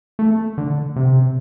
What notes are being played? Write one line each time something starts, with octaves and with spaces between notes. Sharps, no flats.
A3
D3
C3